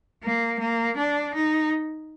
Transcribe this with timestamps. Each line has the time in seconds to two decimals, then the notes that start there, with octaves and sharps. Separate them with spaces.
0.23 A#3
0.60 A#3
0.97 D4
1.35 D#4